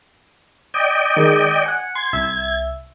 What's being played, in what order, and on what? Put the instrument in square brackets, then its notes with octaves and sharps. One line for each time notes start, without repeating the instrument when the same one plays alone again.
[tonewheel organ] D5 D#5 G5
[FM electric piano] D#3 G#3
F#5 G#5 C#7
[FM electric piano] C6 [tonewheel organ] G#6
[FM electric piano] C2 E5